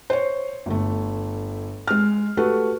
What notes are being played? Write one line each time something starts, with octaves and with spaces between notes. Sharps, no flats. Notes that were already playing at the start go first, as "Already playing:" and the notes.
C5 C#5
G1 A3
G#3 F6
A3 F#4 G4 A4 B4